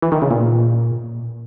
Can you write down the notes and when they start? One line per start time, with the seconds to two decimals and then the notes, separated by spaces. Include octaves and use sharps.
0.02 E3
0.12 D#3
0.22 C#3
0.31 A#2